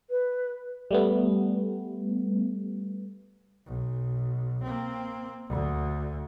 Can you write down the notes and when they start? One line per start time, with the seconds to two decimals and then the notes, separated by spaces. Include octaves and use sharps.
0.10 B4
0.91 G3 A3 B3
3.67 B1
4.63 A#3 C4
5.48 D2 D3